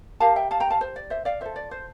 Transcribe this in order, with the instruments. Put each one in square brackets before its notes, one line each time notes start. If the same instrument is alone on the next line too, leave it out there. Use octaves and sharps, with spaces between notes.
[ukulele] E4 G4 A#4 F5 A5
E5 G5
F5 A5
G5 A#5
F5 A5
C5
D5
C5 E5
D5 F5
F4 A4 C5 E5
D5
C5